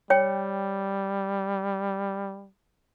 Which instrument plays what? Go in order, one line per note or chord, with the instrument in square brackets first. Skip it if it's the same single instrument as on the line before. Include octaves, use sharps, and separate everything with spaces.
[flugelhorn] G3 [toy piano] C#5 G5